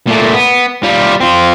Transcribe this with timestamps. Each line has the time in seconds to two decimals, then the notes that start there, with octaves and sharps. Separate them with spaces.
0.08 A#2 A3
0.34 B3
0.83 G3 F4
1.20 C4 F4